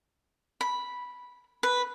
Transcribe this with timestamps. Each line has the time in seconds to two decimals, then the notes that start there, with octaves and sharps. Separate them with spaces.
0.61 B5
1.63 B4